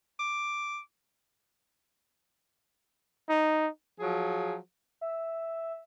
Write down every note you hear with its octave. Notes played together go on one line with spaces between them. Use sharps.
D6
D#4
F3 F#3 G#4
E5